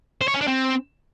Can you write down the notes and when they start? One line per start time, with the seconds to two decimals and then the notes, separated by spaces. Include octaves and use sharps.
0.21 C5
0.28 C#5
0.34 C#4
0.41 D4
0.48 C4